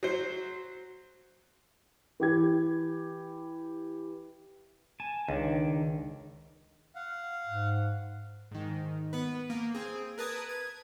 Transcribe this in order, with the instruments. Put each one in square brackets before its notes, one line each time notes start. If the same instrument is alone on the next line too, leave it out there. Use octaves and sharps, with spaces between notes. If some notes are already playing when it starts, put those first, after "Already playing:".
[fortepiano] F#3 C5
[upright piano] E3 G4 G#6
[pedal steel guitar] G#5 A5
[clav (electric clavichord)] C#2 [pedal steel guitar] D#3 D4
[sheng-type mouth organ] F5 F#5
[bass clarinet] G#2
[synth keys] G#2 D#3
B3 B4
A#3
C4 G#4
A#4 B4 A5 D#6 G#6
G#6